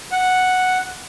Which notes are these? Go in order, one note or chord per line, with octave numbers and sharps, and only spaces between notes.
F#5